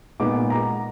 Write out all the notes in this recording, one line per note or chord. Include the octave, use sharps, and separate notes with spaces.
A#2 G#3 B3 D#4 D6
A#5